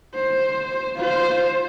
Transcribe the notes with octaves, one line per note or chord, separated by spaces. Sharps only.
C5
F4 C5